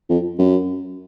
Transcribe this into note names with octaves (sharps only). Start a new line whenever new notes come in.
F2
F#2